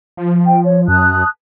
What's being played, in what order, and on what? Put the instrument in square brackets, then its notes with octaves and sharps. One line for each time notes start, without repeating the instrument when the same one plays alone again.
[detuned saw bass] F3
[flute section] G5
C#5
[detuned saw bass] F#2 [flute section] A5 D#6 F#6